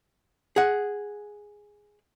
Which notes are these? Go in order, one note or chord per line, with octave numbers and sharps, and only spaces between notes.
G#4 F#5